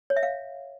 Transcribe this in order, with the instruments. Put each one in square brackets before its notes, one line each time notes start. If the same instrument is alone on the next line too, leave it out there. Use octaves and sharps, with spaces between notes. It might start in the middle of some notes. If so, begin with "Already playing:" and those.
[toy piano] C#5
E5
F5